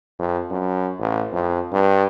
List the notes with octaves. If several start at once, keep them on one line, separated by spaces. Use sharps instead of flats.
F2
F#2
A1
F2
G2